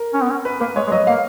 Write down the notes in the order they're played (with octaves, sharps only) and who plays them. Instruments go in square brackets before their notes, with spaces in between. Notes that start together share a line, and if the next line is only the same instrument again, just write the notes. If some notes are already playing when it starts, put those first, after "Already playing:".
Already playing: [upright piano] A#4
[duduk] C#4
B3
C#4
[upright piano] B4
[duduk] A#3 [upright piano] B4
[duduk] G#3 [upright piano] C#5
[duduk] G#3
[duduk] F#3 [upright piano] D#5
[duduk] A#3 [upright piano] F5